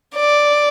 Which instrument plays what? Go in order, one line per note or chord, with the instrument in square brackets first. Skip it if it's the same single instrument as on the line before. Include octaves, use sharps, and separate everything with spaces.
[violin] D5